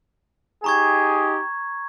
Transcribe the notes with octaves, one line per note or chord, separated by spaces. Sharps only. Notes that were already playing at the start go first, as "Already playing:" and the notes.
D#4 G4 G#4 A#5 C#6 G#6